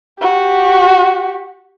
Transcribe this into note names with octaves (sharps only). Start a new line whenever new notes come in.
F#4 G4